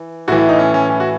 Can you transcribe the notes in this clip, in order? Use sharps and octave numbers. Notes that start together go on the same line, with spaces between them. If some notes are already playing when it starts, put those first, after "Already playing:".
Already playing: E3
A2 E3 F#4
E4
D#4
C#4
C#4
C#4
F#4